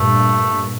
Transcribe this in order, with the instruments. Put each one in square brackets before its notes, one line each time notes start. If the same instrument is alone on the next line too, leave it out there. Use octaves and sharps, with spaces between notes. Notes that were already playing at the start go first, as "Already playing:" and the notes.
Already playing: [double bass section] G2 A#2 [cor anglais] A3